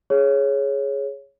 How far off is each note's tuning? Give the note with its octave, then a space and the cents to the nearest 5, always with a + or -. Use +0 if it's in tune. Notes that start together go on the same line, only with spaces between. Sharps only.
G#4 +0 C#5 +0